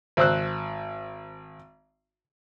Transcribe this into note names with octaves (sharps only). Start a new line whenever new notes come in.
G#1 C5 E6 F#6